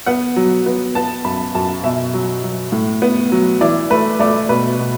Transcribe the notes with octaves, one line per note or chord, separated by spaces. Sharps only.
B3 F#5
F#3
B3
B3 A5
F#2 B5
F#2 A5
B2 E5
F#3
F#3
A2
B3
F#3
E3 D5
A3 B4
A3 D5
B2 B4
B2